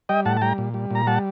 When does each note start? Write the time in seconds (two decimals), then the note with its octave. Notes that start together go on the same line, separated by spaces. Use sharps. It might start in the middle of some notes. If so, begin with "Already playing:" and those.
0.09 G3 D#5 G5
0.25 A2 F#5 A5
0.37 A5
0.41 G3 G5 A#5
0.58 A#2
0.74 G3
0.91 A#2 A#5
1.07 G3 F#5 A5